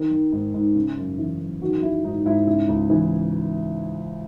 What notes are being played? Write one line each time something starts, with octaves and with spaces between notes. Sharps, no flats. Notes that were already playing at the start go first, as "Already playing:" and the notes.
Already playing: D#3
D#3
G#2
G#2
C#3
F#2
E3
F#2
D#3 F#4
D#3 E4
G#2 D#4
G#2 E4
C#3 E4
C#2
E3